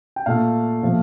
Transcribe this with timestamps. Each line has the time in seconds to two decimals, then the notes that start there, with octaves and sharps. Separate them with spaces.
0.16 G5
0.26 A#2 A3 F5
0.83 A#2 F3 A3